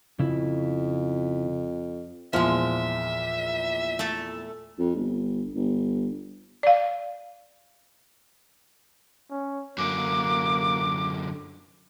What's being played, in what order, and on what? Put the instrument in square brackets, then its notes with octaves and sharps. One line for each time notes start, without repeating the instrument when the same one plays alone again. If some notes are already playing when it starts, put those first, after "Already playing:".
[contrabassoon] F2 [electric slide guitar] C#3 E4
[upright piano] E2 A#2 F6 [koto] F3 G#3 [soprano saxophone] E5
[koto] A3 A4
[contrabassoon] F2
G1
G1
[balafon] D5 F5
[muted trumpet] C#4
[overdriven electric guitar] F#2 D3 [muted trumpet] A#3 [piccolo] D6